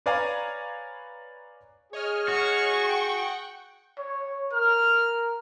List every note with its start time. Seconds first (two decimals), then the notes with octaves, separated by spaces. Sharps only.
0.06 B4 C#5 D5 F5 G#5 A#5
1.93 G#4 C#5 D#5 F6
2.28 F#4 C#6
2.89 F#5 G5
3.98 C#5
4.53 A#4 F6